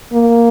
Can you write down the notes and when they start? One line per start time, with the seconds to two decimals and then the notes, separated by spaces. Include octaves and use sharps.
0.13 A#3